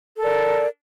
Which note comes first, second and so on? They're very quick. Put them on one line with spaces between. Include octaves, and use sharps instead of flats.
A4 A#4 D5